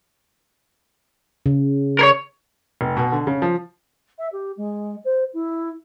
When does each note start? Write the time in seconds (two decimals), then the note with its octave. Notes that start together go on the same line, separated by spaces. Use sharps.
1.46 C#3
1.99 A#4 C#5
2.81 F1
2.97 B2
3.12 D3
3.27 C#3
3.42 F3
4.19 E5
4.33 G4
4.57 G#3
5.05 C5
5.34 E4